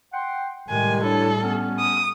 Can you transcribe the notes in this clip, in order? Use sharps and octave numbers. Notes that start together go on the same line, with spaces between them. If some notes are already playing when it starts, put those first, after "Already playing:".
F#5 G5 C6
A2 C3 D#3 G3 G#3 G#5
D4 E4 A4 C#5
B3 C#4
D#6